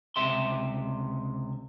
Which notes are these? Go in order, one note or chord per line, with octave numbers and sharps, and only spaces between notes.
C#2 C3 E5 C6